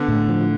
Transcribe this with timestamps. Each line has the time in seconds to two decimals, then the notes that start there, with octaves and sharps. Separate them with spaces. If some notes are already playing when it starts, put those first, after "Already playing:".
Already playing: D3 B3
0.08 A2
0.29 F3